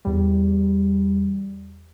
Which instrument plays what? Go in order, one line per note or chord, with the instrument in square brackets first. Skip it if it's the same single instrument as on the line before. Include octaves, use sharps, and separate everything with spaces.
[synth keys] E2 G3